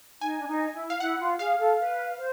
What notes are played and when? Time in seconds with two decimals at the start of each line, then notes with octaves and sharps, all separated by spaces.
0.21 D#4 G#5
0.41 D4
0.47 D#4
0.74 E4
0.90 F5
1.00 E4 F#5
1.20 F4
1.39 G#4 F5
1.59 A4
1.79 B4
2.18 C5